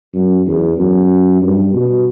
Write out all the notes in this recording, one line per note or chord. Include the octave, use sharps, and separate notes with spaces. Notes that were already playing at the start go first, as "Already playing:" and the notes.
F#2
E2
F#2
G2
B2